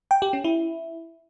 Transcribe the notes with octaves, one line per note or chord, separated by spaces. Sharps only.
G5
G4
C#4
E4